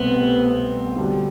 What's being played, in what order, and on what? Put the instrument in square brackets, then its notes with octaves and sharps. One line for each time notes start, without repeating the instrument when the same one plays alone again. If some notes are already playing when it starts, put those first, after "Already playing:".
Already playing: [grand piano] C2 B2 A3 C4 [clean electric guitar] B3
[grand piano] D3 G3 D4 F#4